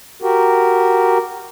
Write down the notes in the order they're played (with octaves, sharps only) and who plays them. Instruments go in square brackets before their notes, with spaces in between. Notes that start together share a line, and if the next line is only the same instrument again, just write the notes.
[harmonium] F#4 G4 A#4